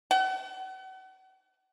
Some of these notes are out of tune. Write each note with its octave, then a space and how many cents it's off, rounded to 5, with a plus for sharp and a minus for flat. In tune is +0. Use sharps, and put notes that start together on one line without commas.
F#5 +35